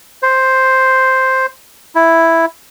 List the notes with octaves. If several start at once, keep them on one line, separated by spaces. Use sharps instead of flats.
C5
E4